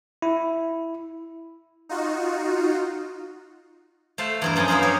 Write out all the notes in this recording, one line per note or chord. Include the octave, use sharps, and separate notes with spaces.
E4
D#4 F4 F#4
A3 C5 F5 A5
E2 G2 A#4
F#2 F3 C#4 D#4 G#5
G2 A#3 B3 C5 A#5
G#3 G4 C#5